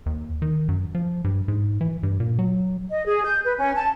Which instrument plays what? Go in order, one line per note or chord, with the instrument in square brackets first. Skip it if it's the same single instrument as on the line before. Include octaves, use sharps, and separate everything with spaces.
[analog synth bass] D#2
D#3
F#2
F3
G2
G#2
E3
G2
A#2
F#3
[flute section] D#5
G#4
G6
B4
C#4
A5